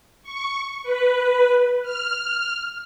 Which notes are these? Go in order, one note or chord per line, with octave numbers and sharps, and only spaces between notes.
C#6
B4
F6